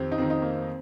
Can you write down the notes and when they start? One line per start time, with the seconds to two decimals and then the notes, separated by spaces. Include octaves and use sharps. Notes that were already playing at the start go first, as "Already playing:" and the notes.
Already playing: F2 D#3 C4 G4
0.12 D#4
0.18 F2 D#3 C4
0.30 D#4
0.42 A#3
0.55 C4